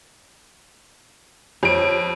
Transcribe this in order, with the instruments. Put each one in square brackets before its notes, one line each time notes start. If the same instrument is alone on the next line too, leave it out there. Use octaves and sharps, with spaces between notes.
[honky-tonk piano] F2 D7 [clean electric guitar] G4 C#5